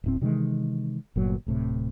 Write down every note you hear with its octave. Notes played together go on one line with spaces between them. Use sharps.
D1 A2 C4
C3 D#3 E3 G#3
G1 A#2 F#3
D1 A2 C3